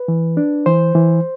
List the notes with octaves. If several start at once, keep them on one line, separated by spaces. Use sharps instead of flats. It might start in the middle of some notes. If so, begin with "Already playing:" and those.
Already playing: B4
E3
D4
E3 C5
E3